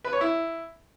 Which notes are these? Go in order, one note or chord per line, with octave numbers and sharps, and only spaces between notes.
B4
C#5
E4